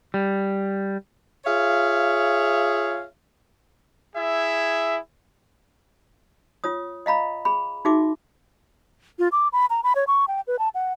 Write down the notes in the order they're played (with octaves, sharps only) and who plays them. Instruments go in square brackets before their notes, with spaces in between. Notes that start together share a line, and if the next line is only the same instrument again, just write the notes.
[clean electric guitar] G3
[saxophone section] F4 G#4 C#5 E5 F5
[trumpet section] E4 G#4 E5
[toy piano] F4 C#5 D#6
D#5 F5 A#5 B5
G#4 B5
D#4 F#4 G#4 E5 D6
[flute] F4
D6
B5
A#5
B5
C#5
C#6
G5
B4
A5
F#5